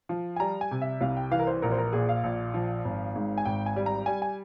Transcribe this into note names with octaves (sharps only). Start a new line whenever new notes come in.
F3
G#5
G3 A#5
G#5
C3
E5
C2 F5
G5
E3 F5
A#4
C5
A#1 A#4
C5
A#4
A#2 G#4
F5
A#1
F3
G#1
G#2
G#5
G#1 G5
G#5
G3
A#5
G3 G#5
G#5